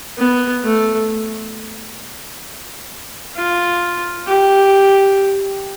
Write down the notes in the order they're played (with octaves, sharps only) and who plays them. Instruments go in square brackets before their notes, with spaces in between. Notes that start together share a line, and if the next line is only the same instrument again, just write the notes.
[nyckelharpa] B3
A3
F4
G4